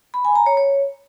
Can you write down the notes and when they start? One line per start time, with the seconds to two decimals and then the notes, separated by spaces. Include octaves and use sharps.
0.14 B5
0.25 G#5
0.36 A#5
0.46 C#5
0.57 C#5